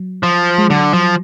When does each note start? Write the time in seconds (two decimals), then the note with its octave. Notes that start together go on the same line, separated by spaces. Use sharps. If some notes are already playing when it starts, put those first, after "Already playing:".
Already playing: F#3
0.23 F3
0.58 G#3
0.70 D3 F#3
0.93 F3 F#3